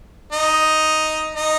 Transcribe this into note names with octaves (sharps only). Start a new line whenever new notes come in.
D#4
D#4